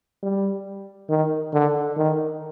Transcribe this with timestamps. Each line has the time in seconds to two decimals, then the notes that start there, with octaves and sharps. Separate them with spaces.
0.23 G3
1.09 D#3
1.53 D3
1.97 D#3